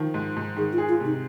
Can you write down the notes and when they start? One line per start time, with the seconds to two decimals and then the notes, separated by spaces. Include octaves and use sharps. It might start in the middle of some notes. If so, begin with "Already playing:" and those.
Already playing: D#3 F3
0.14 G#2
0.37 G#2
0.57 D#3 G#4
0.73 F4
0.78 G#4
0.89 F4
1.00 C3
1.05 D#4